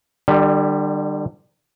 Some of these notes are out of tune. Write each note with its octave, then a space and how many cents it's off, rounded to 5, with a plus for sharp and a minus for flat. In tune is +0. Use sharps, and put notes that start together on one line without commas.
D3 +40 G3 +0